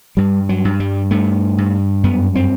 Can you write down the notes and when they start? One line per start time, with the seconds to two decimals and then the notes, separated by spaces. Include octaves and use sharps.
0.17 G2 G3
0.49 F#3
0.65 G2
0.80 G3
1.11 G2 A3
1.58 G2
2.04 F#2 B3
2.35 C4